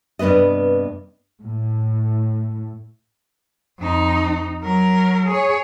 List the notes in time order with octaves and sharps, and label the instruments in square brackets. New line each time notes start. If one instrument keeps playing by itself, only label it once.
[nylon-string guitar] G2 C3 B3 B4 D#5
[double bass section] A2
[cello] F2 D#4
F#3 A#4
G#4 C#5